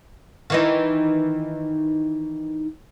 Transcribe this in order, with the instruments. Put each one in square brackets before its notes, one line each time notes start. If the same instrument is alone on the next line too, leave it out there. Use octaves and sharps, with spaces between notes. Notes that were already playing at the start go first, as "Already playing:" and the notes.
[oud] D#3 E3 D#4